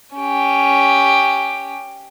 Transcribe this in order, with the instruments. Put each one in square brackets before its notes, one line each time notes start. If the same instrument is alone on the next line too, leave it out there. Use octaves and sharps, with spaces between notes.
[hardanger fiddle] C#4 G4